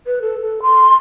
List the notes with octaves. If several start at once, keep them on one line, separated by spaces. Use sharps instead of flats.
B4
A4
A4
C6